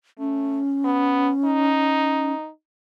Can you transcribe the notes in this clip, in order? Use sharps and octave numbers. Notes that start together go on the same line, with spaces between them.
A3 C#4
B3
D#4